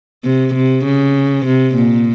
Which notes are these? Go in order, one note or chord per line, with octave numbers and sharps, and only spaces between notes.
C3
C3
C#3
C3
A#2